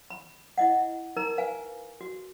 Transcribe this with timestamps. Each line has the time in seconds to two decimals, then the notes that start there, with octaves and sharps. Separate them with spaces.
0.10 B5
0.58 E4 D#5 F#5
1.16 D#4 A#4 A#5
1.38 B4 F5 G#5
2.01 F#4